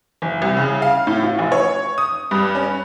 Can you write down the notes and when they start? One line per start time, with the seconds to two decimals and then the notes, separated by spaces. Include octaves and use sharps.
0.22 F#1
0.42 C2
0.57 C#3
0.82 F5
1.07 A2
1.23 F4
1.39 F1
1.52 C#5
1.98 D#6
2.31 G2
2.55 C#4